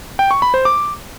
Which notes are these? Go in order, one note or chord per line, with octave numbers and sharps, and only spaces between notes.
G5
C#6
B5
C5
D6